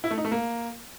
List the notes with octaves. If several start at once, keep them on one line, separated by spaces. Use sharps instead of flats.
E4
A3
D#4
A3
A#3